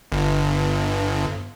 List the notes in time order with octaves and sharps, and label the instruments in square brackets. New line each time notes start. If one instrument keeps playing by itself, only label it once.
[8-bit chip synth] G1